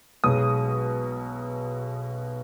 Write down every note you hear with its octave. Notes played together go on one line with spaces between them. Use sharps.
B1 B2 G#3 D#6